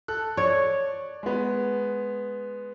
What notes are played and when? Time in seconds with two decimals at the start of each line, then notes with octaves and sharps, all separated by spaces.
0.08 A4 F#6
0.37 C#5 D5
1.23 G#3 B3